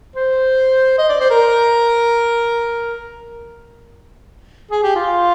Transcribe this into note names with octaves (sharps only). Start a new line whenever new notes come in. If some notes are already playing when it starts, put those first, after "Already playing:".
C5
D#5
D5
C5
A#4
G#4
G4
F4